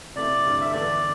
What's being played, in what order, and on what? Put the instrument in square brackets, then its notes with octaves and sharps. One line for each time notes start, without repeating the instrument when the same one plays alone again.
[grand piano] C3 A3 E4 [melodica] D5
[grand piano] G2 D3 G3
[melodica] E5
[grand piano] E2 D3 A3 D4 [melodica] D5